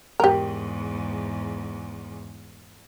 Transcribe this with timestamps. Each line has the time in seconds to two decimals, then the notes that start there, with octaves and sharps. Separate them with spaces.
0.20 E2 G#2 G4 A#4